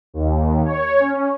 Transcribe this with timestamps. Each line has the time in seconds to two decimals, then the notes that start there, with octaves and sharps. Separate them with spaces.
0.14 D#2
0.65 C#5
1.00 C#4